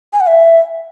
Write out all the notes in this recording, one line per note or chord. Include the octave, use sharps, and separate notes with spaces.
G#5
F#5
E5